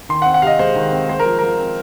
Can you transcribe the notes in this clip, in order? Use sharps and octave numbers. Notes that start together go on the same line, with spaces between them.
D#3 C6
F#5
C4
F#5
C3 D#5 F5
G#3 C5
D#3
C4
G#3 C5
A#4
F3
F3 A#4
C4